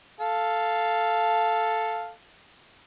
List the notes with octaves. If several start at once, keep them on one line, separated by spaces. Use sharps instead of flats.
A4 F5